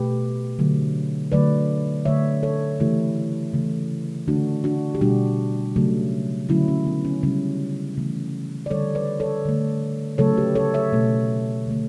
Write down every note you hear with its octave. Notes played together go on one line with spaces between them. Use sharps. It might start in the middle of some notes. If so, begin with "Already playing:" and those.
Already playing: B2 A3 G4 B4
D3 F#3 A3
D3 F#3 A3 B4 D5
D3 A3 C#5 E5
A4 C#5
C#3 E3 A3 E4 G4
C#3 E3 A3
D3 A3 D4 F#4
D4 F#4
G4
B2 G3 D4 F#4
C#3 F#3 A3
D3 F#3 A3 C#4 E4
C#4
B3
C#4
C#3 G3 C#4
C#3 E3 A3
D5
D3 G3 A4 C#5
B4 D5
A4 C#5
D3 A3
C#3 F#3 A3 A4 C#5
G4 B4
A4 C#5
C#5 E5
B2 A3
D3 A3